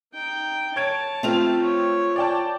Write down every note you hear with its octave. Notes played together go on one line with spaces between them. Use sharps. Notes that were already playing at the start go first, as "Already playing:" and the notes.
D#4 G5
C#5 A5 G#6 D7
A3 C4 F4 G4 C5 F7
C#5
D5 G5 A5